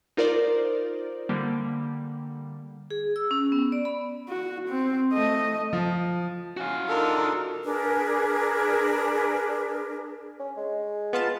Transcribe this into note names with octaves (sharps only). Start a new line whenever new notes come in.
D#4 F4 A#4 C5 D5
D3 G3 A#3
G#4
E6
C#4
B3
D5
B5
F#4
C4
A3 D#5
F3
C#4 F#4 F5
D4 D#4 F4 A4 A#4
D4 G#4 A#4 B4
C#4
G#3
B3 F4 A5